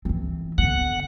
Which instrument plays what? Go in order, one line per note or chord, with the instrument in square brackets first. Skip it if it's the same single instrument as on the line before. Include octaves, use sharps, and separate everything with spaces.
[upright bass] E3 C4
[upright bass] D3 B3 [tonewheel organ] F#5